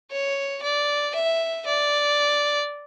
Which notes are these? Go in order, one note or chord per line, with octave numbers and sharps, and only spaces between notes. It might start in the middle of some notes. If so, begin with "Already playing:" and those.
C#5
D5
E5
D5